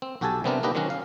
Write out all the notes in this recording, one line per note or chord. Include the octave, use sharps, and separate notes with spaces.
C4
B1 F#4 G4 A4 G#5 A5
C3 G3 B3 C4 D4 A#4
A#3 D4 D#4 G4 B4 D#5
D#3 F#3 C4 C#4 F#4
F5